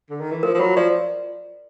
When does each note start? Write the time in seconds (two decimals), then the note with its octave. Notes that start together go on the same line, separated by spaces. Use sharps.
0.10 D3
0.21 D#3
0.31 E3
0.43 F3 A#4
0.54 F3
0.60 F#3 F4
0.76 F3 D5